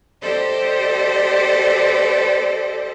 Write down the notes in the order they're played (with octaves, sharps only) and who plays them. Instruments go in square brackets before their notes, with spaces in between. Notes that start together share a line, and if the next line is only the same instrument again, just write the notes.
[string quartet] G4 A4 C5 D5 D#5